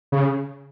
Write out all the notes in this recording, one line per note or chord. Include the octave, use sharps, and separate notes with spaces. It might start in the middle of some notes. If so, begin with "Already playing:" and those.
C#3